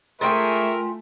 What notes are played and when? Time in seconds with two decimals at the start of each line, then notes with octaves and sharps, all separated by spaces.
0.21 A3 F4 G#4 A#4 E5 G5 G#5 C#6